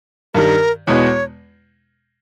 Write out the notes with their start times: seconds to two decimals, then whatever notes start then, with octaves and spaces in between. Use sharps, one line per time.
0.34 G2 D#3 G3 A#4
0.87 E2 B2 G#3 B3 C#5